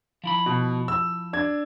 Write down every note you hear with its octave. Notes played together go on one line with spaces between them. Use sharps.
F3 E4 B5
B2
E6
D4 G#6